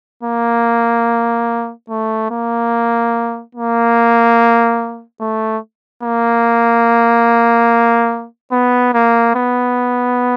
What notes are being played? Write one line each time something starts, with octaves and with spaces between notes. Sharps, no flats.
A#3
A3
A#3
A#3
A3
A#3
B3
A#3
B3